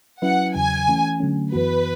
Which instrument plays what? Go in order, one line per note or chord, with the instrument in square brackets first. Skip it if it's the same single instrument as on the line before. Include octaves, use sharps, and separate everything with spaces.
[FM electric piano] F#3 C#4 E4 B4 E5 [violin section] F#5
[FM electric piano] E2 C#3 F#3 [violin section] G#5
[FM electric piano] E3 A3 C#4
D3 F#3 A3 C#4
[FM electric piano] F#2 E3 B3 F#4 [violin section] B4